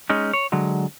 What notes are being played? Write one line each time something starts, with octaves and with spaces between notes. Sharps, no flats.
G#3 C#4 D#4
C#5
D3 F#3 G#3